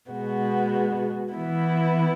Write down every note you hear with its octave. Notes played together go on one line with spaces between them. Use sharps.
B2 G#3 B3 F#4
E3 B3 E4